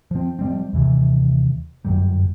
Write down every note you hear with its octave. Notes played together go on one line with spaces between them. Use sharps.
F3 C4
F3 G3 C4
D#2 C3 E3
G1 F#2 F#3 G3